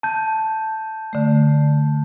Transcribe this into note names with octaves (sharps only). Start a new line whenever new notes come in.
A5 G6
D3 A3